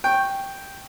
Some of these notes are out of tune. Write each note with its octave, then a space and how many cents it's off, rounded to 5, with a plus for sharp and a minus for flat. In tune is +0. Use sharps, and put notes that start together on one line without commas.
G5 +0 C#6 -15